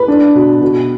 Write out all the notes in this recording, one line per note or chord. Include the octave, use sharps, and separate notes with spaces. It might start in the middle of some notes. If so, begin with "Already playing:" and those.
Already playing: B4
D4
B2
B2